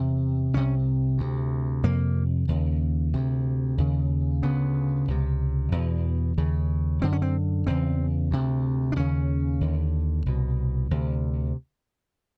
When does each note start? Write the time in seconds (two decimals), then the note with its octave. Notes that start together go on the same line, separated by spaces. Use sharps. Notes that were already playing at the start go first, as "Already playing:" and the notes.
Already playing: E2 C3
0.53 C2 C3 C#4
1.18 D2 C3
1.83 F2 C3 A#3
2.49 D#2 C#3
3.13 D2 C3
3.78 D#2 C#3
4.42 D2 C#3 B3
5.08 C#2 C3
5.72 E2 B2
6.38 D#2 C#3
7.02 F#2 D3 C4
7.13 C#4
7.22 C4
7.67 E2 C#3 C4
8.31 D2 C3
8.92 D4
8.96 D#2 C#3 C#4
9.61 D#2 D3
10.26 C2 B2
10.91 D2 C3